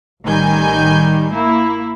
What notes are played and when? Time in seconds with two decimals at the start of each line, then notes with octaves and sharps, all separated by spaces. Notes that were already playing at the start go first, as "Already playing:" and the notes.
0.24 A1 D#3 G3 G#5 G6
1.33 A#3 E4